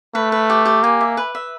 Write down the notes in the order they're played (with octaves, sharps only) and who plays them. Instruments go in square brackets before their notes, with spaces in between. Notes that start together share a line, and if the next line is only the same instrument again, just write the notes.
[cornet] A3 [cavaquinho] B4
[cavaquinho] B4
G4
G4
[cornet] A#3 [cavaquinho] G#5
[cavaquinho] E5
B4
E5